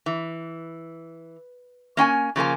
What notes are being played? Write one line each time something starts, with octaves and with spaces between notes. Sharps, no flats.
E3
A#3 C#4 G5 G#5
C#3 F3 A#3 G#5